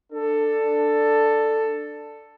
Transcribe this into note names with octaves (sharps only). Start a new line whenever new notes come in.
D4 A4